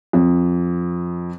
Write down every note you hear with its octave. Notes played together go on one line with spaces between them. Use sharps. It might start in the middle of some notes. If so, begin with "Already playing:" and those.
F2